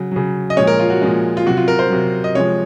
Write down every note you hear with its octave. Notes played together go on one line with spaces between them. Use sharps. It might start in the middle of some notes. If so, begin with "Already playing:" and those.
Already playing: C#3 F#3
C#3 F#3
D#5
A#2 F3 G#3 C#5
A#4
F4
F#4
A#2 F3 G#3
F4
C3 F#3 F#4
F4
A#4
C5
C3 F#3
D#5
C3 F3 G#3 C#5